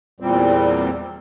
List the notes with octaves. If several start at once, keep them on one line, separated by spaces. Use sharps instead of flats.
E2 A#2 G3 C4